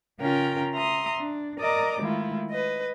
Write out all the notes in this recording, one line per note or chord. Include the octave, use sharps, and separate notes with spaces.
C#3 C#4 F4 A#4 G5 A#5
E5 A#5 C6 D#6
D4
A#4 D5 D#5 A#5 D6
D#3 G#3 A3 E4 F4
B4 D#5